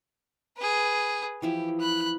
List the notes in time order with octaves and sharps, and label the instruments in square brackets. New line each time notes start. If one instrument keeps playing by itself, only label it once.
[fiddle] G#4 B4
[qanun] E3 F3 E4 [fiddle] G4
[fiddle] B5 F#6